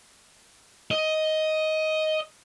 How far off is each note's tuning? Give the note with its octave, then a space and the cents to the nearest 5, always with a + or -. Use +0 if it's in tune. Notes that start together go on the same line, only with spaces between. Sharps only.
D#5 +10